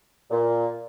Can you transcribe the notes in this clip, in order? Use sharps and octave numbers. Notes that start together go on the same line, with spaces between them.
A#2